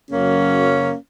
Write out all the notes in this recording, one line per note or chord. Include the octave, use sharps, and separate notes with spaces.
F#2 C#3 F#3 A#3 C#4